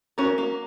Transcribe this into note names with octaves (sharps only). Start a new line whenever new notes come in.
C#4 F#4 A#4
A#3